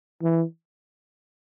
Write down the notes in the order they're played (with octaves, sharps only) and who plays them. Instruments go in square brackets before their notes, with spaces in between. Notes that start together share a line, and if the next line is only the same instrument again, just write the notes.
[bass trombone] E3